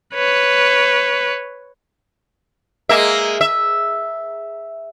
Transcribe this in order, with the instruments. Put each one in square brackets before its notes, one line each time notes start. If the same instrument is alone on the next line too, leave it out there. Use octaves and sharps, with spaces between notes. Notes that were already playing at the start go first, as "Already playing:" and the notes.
[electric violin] B4 C#5
[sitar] G#3 A#3 E5
E5